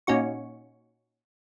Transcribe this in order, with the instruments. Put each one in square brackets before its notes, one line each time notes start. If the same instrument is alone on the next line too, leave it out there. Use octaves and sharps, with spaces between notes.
[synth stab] A#2 C#4 D#4 F#4 C#6